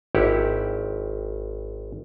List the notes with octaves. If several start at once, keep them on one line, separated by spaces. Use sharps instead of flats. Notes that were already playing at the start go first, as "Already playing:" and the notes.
G#1 E4 G4 F#5